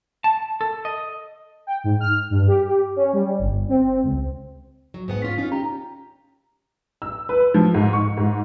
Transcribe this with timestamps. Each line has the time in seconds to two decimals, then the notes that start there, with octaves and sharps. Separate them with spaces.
0.24 A5
0.61 A4
0.85 D#5
1.67 G5
1.84 G#2
2.00 F6
2.30 G2
2.48 G4
2.96 C#4
3.13 G3
3.39 G1
3.69 C4
4.03 C#2
4.94 F#3
5.08 G#2 B3 F#5
5.22 C#4 F4 B6
5.38 C#4 D#4 F4 C#5
5.52 G4 A#5
7.02 E6
7.29 B4
7.54 F3
7.74 G#2
7.93 C#6
8.17 G#2